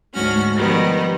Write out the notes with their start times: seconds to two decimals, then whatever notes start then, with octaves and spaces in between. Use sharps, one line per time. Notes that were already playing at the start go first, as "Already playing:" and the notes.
0.14 D2 G#2 C#4 F#4 F6
0.54 D#3 F3 G3 B3 D#4